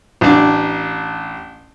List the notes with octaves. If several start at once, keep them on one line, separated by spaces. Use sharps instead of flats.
A1 D4